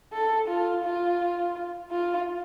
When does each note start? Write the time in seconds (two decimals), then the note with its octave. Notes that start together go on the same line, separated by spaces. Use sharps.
0.13 A4
0.48 F4
0.84 F4
1.92 F4